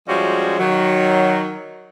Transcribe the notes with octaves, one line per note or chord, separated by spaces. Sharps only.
F3 G3 G#3 C#4 F#4
D#3 F#3